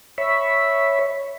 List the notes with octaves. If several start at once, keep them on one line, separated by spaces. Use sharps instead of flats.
C#5 E5 B5